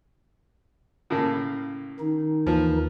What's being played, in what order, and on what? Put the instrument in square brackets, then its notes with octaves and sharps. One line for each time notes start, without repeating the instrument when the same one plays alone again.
[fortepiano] A2 C#3 A#3
[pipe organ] D#3 D#4
[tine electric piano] D#2 E3 B4 [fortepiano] F3